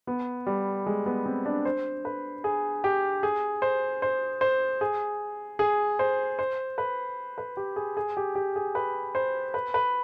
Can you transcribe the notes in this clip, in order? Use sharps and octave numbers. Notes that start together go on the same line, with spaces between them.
B3
G3
G#3
B3
C4
D4
C5
B4
G#4
G4
G#4
C5
C5
C5
G#4
G#4
C5
C5
B4
B4
G4
G#4
G#4
G4
G4
G#4
B4
C5
B4
B4